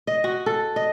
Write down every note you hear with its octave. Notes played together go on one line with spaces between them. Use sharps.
D#5
F#4
A4
D#5